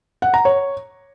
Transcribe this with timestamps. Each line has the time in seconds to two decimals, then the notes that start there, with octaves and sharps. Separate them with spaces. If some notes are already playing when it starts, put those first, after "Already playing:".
0.22 F#5
0.34 A#5
0.45 C#5